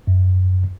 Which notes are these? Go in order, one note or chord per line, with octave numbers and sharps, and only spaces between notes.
F#2